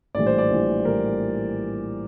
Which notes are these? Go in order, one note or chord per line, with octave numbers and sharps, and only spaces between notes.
A#1 A2 E3 G3 D5
C5
D5
A#1 A2 E3 G3
A2 E3 G3 A#4